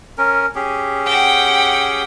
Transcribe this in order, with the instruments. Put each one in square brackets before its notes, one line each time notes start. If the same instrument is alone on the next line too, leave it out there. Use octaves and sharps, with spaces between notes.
[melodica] C#4 A#4
C#4 G4 G#4
[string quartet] F#5 G5